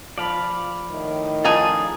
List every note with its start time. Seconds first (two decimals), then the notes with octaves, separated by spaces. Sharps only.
0.18 F3 D5 F5 B5
0.90 A2 D#3
1.45 C#3 F3 D#4 G#4 A4 D5